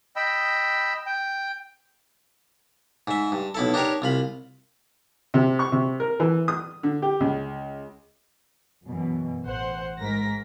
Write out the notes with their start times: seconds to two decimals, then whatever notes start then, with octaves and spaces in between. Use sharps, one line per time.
0.16 D#5 G5 B5 E6
1.06 G5
3.07 G#2 E5
3.32 G2
3.55 B1 E4 A4
3.74 D4 D#4 G4 A#4 C#5
4.02 C2 F4 B5
5.34 C3
5.59 C#6
5.72 C3
6.00 A#4
6.20 E3
6.48 D#6
6.83 D3
7.02 G4
7.20 C#2
8.85 F#2 B2 E3
9.43 A1 C5 F#5
9.99 G#2 A#4 A#6 B6